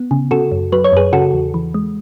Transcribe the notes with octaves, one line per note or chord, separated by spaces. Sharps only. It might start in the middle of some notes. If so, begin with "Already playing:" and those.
Already playing: B3
C#3
C#3 F#4 A4
F#2
F#3 B4
C#5
F#2 G#4 B4
C#3 F#4 A4
E2
E3
G#3